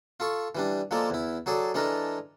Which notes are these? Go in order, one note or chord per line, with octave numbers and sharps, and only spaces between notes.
F4 A4 C#6
E3 G3 D4
F3 G#3 A#3 A4 D5
E2 E4
F#3 G#4 A4 D5
E3 G#3 D4 A4 A#4